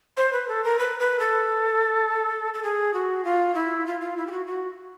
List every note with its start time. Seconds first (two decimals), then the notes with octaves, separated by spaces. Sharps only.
0.17 C5
0.33 B4
0.48 A4
0.64 A#4
0.79 B4
1.00 B4
1.20 A4
2.54 A4
2.63 G#4
2.94 F#4
3.24 F4
3.55 E4
3.86 F4
4.01 F4
4.17 E4
4.27 G4
4.31 F#4
4.47 F#4